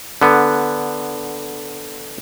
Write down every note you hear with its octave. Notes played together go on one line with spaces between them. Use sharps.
D3 B3